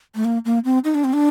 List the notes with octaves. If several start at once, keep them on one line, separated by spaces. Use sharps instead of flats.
A3
A#3
A#3
C4
D#4
D4
C4
D4